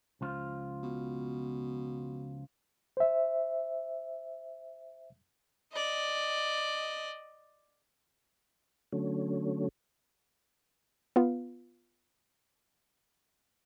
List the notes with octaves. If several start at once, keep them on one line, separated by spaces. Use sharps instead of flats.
C#2 F3 F4
B2
C5 E5
D5 D#5
D3 F#3 A3 C#4
B3 F4